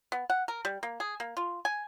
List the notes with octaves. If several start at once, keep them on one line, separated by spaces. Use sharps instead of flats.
B3
F#5
A#4
G3
A#3
G#4
A#3
F4
G#5